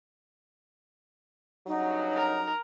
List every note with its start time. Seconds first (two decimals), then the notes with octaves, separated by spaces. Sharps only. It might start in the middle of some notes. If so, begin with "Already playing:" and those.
1.67 G2 C#3 F#3 D#4
2.16 A#4